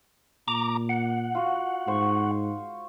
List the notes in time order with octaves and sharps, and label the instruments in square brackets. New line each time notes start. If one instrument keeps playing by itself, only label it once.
[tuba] A#2 [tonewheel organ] A#5 D6
[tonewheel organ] F#5
[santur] F4 F#4
[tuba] G#2 [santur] C5 C#6